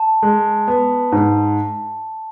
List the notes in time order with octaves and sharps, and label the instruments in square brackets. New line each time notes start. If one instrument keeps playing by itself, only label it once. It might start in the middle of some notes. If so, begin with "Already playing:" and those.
Already playing: [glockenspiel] A5
[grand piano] G#3
B3
G#2